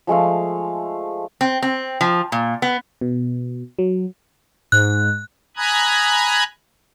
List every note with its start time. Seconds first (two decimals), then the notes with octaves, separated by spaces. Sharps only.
0.07 F3 G#3 A3 F5
1.41 C4
1.62 C4
2.01 F3
2.32 A#2
2.62 B3
3.01 B2
3.79 F#3
4.72 G#2 F#6
5.57 G#5 A#5 B5 D#6 F#6 G#6